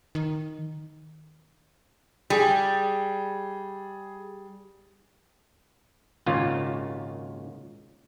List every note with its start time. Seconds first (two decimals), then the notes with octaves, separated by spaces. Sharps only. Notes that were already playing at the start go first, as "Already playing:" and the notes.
0.15 D#3
2.30 G3 G#4
6.26 G#1 D#2 A#2 C#3 F4